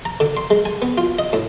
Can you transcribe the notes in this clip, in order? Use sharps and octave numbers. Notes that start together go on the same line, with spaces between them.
A#5
D3
C6
G#3
G#5
B3
F4
D#5
A2